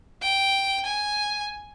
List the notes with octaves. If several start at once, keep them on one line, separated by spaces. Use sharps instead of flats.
G5
G#5